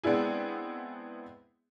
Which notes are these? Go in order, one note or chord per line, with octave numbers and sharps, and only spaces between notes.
G#3 B3 C4 D4 E4 G#4